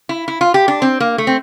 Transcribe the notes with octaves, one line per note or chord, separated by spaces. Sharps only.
E4
E4
F4
G4
D4
C4
A#3
A3
C4